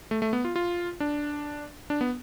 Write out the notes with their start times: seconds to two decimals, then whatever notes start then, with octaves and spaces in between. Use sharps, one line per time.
0.11 A3
0.22 A3
0.33 B3
0.45 F4
0.56 F4
1.00 D4
1.90 D4
2.01 B3